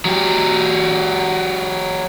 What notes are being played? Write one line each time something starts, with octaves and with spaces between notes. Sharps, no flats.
F#3 G4